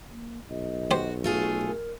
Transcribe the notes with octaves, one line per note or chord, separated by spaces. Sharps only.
A#3
B1 D#5
F#4 G4 C5
A3 F4 F#4 G#4
A#4